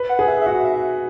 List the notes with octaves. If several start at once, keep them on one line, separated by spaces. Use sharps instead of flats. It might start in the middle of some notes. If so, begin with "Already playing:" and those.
Already playing: B4
F#5
G#4
E5
E5
F#4 F#5
E5